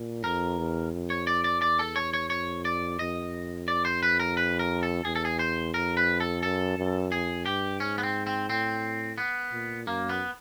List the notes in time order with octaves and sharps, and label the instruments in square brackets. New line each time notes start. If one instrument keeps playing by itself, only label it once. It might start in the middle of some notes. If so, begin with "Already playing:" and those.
Already playing: [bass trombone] A#2
[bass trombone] F2 [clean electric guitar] A#4
[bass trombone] E2
F2
[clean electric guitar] C#5
D5
D5
[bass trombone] E2 [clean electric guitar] D5
[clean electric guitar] A4
C#5
C#5
[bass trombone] F2 [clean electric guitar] C#5
[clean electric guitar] D5
[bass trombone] F2 [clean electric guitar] D#5
[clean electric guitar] D5
C5
B4
A#4
B4
A#4
A4
[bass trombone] E2 [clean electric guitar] G#4
[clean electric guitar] A4
G#4
C5
[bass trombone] F2 [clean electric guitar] A#4
[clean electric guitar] B4
A4
[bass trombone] F#2 [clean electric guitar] A4
[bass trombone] F#2
[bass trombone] F2 [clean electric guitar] G#4
[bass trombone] G2 [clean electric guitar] G4
[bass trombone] G#2 [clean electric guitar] C#4
[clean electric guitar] B3
C4
C4
[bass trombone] A2 [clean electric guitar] C4
[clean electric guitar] B3
[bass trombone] A#2
[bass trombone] F#2 [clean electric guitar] A#3
[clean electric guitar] B3